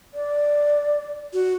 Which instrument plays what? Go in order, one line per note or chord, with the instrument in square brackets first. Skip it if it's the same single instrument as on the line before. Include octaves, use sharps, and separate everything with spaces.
[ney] D5
[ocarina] F#4